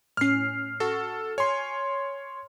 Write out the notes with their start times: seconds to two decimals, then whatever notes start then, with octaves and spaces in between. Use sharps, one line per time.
0.17 A2 C#4 F6 C7
0.80 F#4 A4
1.38 C#5 G#5 C6